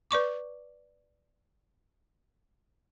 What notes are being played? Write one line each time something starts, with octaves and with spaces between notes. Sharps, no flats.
B4 D5 C#6 D6